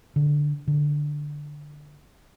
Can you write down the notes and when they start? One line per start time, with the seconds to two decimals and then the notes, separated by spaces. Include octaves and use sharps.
0.16 D3
0.68 D3